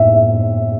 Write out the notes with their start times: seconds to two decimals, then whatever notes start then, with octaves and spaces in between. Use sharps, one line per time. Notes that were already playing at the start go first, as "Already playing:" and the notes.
Already playing: A2 B3 E5